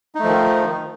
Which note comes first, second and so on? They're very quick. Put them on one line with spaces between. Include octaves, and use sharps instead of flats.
D#4 A3 F3 D#3